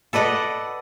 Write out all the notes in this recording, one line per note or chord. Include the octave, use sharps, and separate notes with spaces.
A4 B4 D5 D#5 F#5